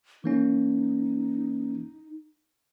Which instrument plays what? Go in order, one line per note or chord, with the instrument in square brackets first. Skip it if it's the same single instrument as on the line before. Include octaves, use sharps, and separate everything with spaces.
[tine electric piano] E3 A#3 C#4 [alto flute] D#4